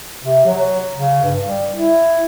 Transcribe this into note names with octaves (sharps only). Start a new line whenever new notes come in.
C3
F#3
C#3
G2
G3
E4